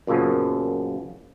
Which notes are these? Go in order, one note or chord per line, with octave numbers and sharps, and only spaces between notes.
F#2 A#2 C#3 F3 B3